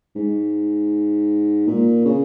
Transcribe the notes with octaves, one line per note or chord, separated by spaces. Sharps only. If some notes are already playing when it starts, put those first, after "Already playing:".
G#2
A#2
C#3